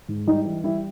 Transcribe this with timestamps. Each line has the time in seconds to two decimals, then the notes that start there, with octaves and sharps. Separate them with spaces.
0.08 G#2
0.27 G3 D#4
0.45 E3
0.64 G3 E4